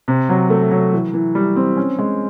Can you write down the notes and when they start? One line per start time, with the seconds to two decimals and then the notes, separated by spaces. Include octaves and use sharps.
0.08 C3
0.29 F#3
0.50 A3
0.71 F#3
0.93 E3
1.14 E3
1.35 G3
1.56 C4
1.77 C#4
1.99 G#3